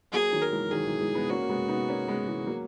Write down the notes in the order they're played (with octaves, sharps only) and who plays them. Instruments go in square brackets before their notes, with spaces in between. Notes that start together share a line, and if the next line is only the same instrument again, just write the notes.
[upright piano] F#3 A#3 [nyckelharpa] G#4
[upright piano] D#3 F#3
[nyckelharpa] A#4
[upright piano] E3 G#3
[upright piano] D#3 F#3 [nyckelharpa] G#4
[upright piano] E3 G#3
E3 G#3
G#3 B3
[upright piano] A#3 C#4 [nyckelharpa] F#4
[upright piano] A#3
G#3 B3
B3 D#4
A#3 C#4
G#3 B3
E3 G#3
F#3 A#3